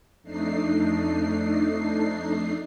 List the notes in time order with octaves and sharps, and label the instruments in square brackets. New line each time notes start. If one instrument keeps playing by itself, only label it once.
[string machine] F2 A3 D4 D#4 C7